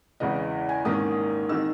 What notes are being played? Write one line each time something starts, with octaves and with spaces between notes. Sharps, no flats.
E2 C#3 E3 G#3 D#5
G#5
G#2 D#3 A#3 C#4 D#6
D#3 G#3 D#4 E6